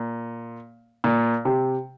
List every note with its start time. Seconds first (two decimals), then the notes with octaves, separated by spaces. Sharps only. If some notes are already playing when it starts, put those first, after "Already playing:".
Already playing: A#2
1.04 A#2
1.45 C3